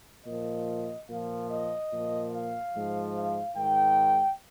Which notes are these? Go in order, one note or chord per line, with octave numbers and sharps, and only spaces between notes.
A#2 F3 D#5
A#2 F3 F5
D#5
A#2 F3
F5
G#2 F3
F5
G#2 D#3 G5